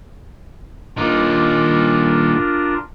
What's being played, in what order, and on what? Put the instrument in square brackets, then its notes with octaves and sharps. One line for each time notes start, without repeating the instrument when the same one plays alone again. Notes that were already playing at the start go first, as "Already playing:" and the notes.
[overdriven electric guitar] A#2 D#4 [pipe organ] D4 F4 A#4